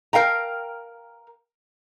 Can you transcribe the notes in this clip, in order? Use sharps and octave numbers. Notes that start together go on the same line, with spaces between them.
A#4 F5 G5 A#5